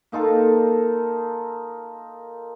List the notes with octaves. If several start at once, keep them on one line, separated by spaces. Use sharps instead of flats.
A#3 D#4 F4 A4